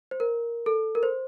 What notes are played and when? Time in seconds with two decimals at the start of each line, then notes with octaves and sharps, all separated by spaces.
0.11 C5
0.20 A#4
0.66 A4
0.95 A#4
1.03 C5